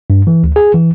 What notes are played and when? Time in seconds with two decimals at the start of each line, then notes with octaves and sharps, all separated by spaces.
0.10 G2
0.27 E3
0.43 D2
0.56 G#4
0.74 E3